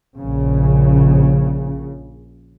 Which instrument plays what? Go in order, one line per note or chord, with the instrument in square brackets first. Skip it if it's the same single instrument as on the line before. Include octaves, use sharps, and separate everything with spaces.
[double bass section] A#1 C#3